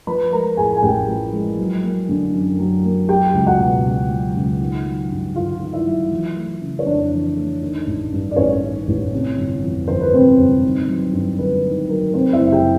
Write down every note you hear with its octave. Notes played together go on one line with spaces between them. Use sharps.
F3 B4 B5
G#3 A#4 A#5
A2 G#4 G#5
G#5
A1 G4 G5
F3
G#3
F#3
A#3
D3
F#2
F#3
A#3
F#3 G4 G5
C#2
F#4 F#5
B2
C#2
F#3
C#2
D#3
F#3
G2
G1 F4 F5
D#3
E4 E5
F#3
E3
A3
C#3
C#5
F2 D4 D5
E3
A3
D#3
A1
G2
D5
A1 C#4 C#5
D#3
A1
C3
G1
F2
G1 C5
B4
C3 C4 C5
G1
D#3
F#3
G2
G1 B4
D#3
F#3 A#4
C3 C4 C5
E4 E5
F#1
G4 G5